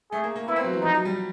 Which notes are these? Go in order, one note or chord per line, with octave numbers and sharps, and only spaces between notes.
A3 G#4
A#3
A#3
B3 E4
C4
F#3
E3
F3 D#4
F#3
G3